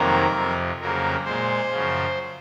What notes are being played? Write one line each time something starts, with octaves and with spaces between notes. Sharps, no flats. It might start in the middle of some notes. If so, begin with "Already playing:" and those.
Already playing: F2 C3 D#3 F#3 A#3 A#4
F2 C3 F3
F2 C#3 F#3 A#3 A#4
A#2 G#3 C5
F#2 C#3 F3